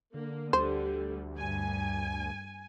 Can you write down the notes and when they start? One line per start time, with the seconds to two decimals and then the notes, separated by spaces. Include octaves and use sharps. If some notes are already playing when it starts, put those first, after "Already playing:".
0.14 D3 A#3
0.53 D2 D3 G3 C5
1.38 G2 G#5